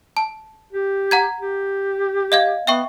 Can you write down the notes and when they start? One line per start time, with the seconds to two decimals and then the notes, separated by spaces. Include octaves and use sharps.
0.17 A5
0.73 G4
1.11 F#5 A#5 G#6
1.40 G4
2.32 D#5 F5 G#6
2.67 B3 E5 G5 C#6